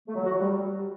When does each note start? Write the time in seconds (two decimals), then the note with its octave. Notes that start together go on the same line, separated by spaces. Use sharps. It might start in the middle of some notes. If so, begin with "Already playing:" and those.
0.07 A3
0.15 F#3
0.23 F#4
0.32 F#3
0.40 G3